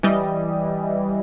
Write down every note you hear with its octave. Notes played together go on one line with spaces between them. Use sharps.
E3 G3 D#5